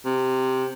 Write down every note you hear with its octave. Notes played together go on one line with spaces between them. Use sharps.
C3